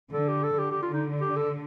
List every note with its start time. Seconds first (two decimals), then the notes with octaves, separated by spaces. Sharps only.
0.12 D3 A4
0.28 G4
0.44 A4
0.59 D3 G4
0.71 G4
0.82 F4
0.93 D#4
1.21 G4
1.36 A4